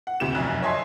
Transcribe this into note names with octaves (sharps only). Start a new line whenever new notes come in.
F#5
D2 C3 G4 E7
F1 B1 F#2 F#6
C#5 D#5 E5 G#5 A5 C6